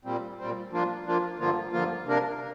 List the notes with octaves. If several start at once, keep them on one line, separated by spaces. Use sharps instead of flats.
A#2 G3 C4
A#2 G3 C4
F3 A#3 D4 F4
F3 A#3 D4 F4
G2 D3 F3 A#3 F4
G2 D3 F3 A#3 F4
C3 A#3 D4 A#4
A#3